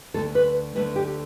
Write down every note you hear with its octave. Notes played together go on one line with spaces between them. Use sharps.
D2 D3 A3 A4
B4
D2 D3 A3 B4
G4